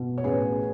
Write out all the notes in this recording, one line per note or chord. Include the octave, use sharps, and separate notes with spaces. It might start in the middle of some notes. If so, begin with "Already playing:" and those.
Already playing: B2
C#5
A1 G#4 B4